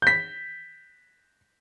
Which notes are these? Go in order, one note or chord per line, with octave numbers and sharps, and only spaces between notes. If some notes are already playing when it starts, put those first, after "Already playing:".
G6 B6